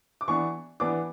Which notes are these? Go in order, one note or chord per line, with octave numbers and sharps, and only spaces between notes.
D6
E3 B3 D4 C#6
E3 B3 D4 D6